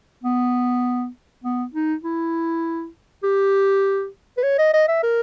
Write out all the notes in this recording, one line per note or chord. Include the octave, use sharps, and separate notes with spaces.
B3
B3
D#4
E4
G4
B4
C#5
D#5
D#5
E5
A#4